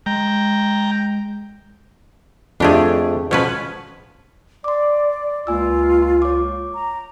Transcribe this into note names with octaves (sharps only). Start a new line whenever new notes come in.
G#3 G5 A#5
F2 A3 D4 G4 G#4
B2 F3 C#4 B4
D5 C6 D6
C#2 A#3 F4 G#5 E6
C#5 D6
A#5